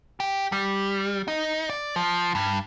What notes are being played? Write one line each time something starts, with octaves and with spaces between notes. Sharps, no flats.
G4
G3
D#4
D5
F3
G2